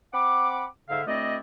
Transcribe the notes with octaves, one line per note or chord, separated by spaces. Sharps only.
C4 F#5 B5 D6
G#2 D3 A4 E5 F5
D2 A3 C4 E4 D5 D#5